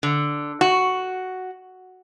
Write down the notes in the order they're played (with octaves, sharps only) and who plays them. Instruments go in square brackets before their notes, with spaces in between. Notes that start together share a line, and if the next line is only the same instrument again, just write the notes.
[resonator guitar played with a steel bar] D3
F#4